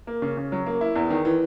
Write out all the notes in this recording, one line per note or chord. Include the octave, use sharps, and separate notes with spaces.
A#3
C#3
C#3
F#3
A#3
E4
E2
D#3
E3